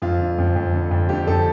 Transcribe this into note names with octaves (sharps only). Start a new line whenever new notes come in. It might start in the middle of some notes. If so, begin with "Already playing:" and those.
F2 F4
D3
F2
F2
D3
F2
D3 G4
F2 A4